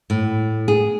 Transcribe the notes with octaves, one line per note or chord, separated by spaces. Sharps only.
A2
G#4